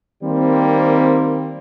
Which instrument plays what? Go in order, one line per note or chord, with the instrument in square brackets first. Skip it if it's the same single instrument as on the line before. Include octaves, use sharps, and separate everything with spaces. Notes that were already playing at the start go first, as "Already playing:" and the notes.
[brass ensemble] D#3 G3 A#3 C4